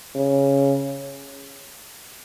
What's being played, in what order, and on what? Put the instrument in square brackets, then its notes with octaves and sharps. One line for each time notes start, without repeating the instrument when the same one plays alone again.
[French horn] C#3